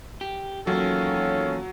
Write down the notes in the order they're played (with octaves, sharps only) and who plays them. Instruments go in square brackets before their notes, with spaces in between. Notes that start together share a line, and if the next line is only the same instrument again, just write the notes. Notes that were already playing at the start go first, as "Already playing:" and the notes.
[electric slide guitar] G4
[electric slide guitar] E2 A#3 [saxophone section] D#3 F4 A4 [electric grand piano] F#3 [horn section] C#4